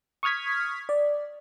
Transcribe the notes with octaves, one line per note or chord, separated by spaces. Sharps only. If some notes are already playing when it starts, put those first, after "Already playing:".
C#6 D#6 F6 G#6 B6
D5